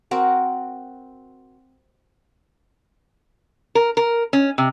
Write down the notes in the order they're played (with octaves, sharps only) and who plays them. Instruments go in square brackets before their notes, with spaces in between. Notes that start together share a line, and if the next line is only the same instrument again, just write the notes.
[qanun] C4 F#4 A#4
[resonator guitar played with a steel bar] A#4
A#4
C#4
C3